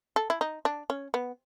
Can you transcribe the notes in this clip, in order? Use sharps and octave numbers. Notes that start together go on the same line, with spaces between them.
A4
E4
D#4
D4
C#4
B3